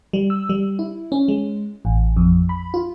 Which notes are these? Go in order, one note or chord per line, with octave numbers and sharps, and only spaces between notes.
G3
E6
G3
E4
C#4
G#3
A1
F2
B5
F4